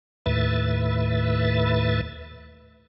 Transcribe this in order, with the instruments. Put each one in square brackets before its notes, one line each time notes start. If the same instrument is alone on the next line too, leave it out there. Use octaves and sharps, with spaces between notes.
[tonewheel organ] D#2 A2 B4 E5 A6